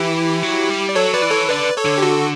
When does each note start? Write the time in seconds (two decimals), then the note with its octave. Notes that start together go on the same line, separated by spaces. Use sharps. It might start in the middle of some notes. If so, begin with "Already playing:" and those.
Already playing: E3 E4 G4
0.43 F#3
0.69 G3
0.89 D5
0.95 F#3 A4 C#5
1.13 B4 D5
1.22 E3
1.31 A4 C#5
1.49 D3 B4 D5
1.76 A4 C#5
1.85 D3
1.98 G4
2.02 F#4 A4